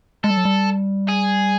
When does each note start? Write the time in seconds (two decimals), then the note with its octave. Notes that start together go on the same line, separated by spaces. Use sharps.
0.24 G#3 A4
0.30 G3
0.37 F#3
0.45 G3
1.09 G#4